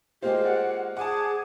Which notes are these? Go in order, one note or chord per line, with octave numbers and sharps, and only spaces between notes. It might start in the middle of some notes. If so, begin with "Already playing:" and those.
G#3 A#3 F4 G4 C5
D5 F#5
G#4 F#5 G#5 A5 D6